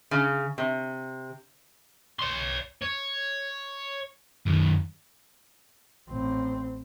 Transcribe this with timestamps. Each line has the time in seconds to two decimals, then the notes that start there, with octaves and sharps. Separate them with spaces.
0.11 C#3
0.58 C3
2.19 C#5 C6
2.82 C#5
4.46 F#2 D#3
6.09 A1 C4